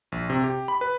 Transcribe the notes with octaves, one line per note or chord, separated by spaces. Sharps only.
A#1
C3
G4
B5
B4